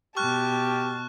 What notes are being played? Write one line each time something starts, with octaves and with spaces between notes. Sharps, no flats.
B2 G4 A5 C#6 F6 F#6